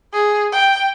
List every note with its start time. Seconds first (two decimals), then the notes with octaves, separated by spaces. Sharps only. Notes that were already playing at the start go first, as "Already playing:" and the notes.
0.13 G#4
0.52 G5